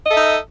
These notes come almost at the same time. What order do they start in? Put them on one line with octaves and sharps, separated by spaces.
D#5 A4 E5 D#4